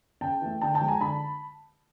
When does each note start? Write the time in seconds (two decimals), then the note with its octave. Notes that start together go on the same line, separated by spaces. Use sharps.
0.21 C#3 G5 A5
0.41 E3 A3
0.61 D3 G5 A5
0.74 G5 A5
0.81 F3 G#3
0.88 G#5 A#5
1.01 D3 A5 B5